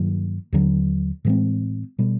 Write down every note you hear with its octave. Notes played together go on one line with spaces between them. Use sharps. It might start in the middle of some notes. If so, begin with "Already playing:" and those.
Already playing: G2 D#3 F#3 A#3
D#2 D3 F#3
A2 E3 G#3 C4
B2 G3